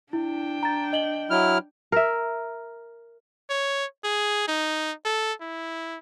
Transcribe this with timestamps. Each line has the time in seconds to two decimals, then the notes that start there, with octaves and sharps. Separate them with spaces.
0.13 D4 E4 G5
0.63 A#5 A6
0.93 D#5 F#7 G7
1.31 F#3 E4 F6
1.92 A#4 E5
3.50 C#5
4.04 G#4
4.48 D#4
5.05 A4
5.41 E4